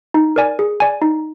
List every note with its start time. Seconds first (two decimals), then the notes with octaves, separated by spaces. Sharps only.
0.14 D#4
0.36 A#4 D5 G#5
0.59 G#4
0.80 D5 G#5
1.02 D#4